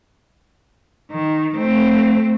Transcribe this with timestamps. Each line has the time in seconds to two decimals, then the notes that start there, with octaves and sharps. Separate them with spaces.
1.11 D#3
1.56 A3 C4